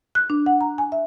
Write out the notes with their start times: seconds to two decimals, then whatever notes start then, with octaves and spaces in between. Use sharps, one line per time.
0.15 F#6
0.30 D4
0.46 F#5
0.61 A#5
0.78 G#5
0.92 E5